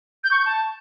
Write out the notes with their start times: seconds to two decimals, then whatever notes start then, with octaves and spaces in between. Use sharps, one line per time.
0.24 G6
0.31 C#6
0.38 G6
0.46 A5